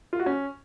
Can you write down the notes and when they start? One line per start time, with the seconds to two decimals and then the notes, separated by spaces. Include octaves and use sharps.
0.13 F4
0.19 F#4
0.26 C#4